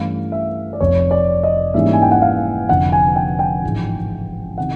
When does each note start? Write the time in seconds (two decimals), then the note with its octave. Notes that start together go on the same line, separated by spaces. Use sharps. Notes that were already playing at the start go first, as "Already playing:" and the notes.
Already playing: G2 E3 A3 C#4 F5
0.32 E5
0.73 D5
0.80 F1 F2 C3 C#5
1.11 D5
1.43 D#5
1.74 G#2 E3 G3 A#3 C#4 E5
1.93 G#5
2.02 G5
2.11 F#5
2.22 F5
2.69 F1 F2 D3 F3 F#5
2.92 G#5
3.16 G5
3.39 G5
3.63 A1 G#2 F3 G#3
4.58 C3 D#3 F#5